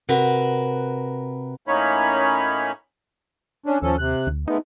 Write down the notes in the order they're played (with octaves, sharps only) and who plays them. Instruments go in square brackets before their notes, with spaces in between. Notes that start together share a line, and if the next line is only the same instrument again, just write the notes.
[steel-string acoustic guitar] C3 F#4 A#4 B4
[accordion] A2 A#3 C#4 D#4 C#5 B5
C#4 D4
[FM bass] D#2 [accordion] F3 C#4 A4
[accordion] C3 F#6
[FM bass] D2
[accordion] G#3 A3 B3 [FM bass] D#4